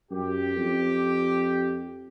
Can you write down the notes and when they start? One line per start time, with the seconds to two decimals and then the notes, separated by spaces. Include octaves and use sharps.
0.11 F#2 G4
0.56 F2